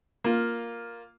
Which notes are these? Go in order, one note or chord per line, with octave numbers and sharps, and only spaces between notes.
A#3 F4